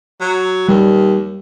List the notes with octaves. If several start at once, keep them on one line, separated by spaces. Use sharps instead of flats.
F#3
D#2 G3